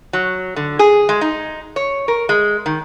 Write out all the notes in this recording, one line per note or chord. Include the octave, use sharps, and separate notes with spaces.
F#3
D3
G#4
G#3
D#4
C#5
A#4
G#3
D#3